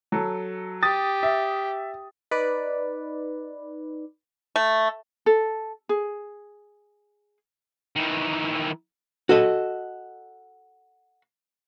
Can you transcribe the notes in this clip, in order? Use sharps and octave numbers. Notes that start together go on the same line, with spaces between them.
F#3 A4
G4 D#6 A6
E5
D#4 B4 D5
A3
A4
G#4
D#3 E3
F#4 A4 D#5